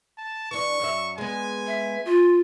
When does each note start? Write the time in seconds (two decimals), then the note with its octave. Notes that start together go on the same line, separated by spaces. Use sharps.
0.18 A5
0.51 E3 D4 C#6
0.80 F#2 F#3 E5
1.18 G#3 B3 G#5
1.67 E5
2.05 F4